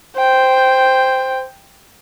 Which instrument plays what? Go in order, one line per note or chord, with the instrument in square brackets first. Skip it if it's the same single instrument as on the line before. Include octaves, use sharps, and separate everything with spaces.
[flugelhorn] C5 [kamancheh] G5